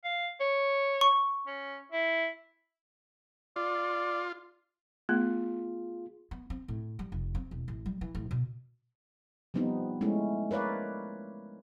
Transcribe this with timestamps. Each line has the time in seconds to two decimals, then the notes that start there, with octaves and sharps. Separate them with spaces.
0.05 F5
0.40 C#5
1.01 C#6
1.47 C#4
1.92 E4
3.56 F4 D5
5.09 A3 B3 F4 G#4
6.31 B3
6.50 C4
6.68 A2
6.99 G3
7.12 F1
7.35 C4
7.51 E1
7.68 A1
7.86 G3
8.01 E3
8.15 A1
8.31 B2
9.54 F3 G3 B3 C4 D#4
10.01 G#3 A3 C#4 E4
10.51 A#4 B4 C#5 D5 F5